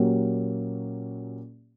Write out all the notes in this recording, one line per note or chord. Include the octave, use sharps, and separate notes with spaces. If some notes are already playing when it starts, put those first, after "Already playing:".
Already playing: A#2 F#3 A#3 C#4 G4